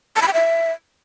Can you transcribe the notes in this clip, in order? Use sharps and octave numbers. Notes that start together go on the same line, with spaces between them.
A5
B5
G5
E5